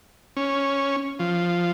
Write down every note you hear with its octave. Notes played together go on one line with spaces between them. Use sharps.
C#4
F3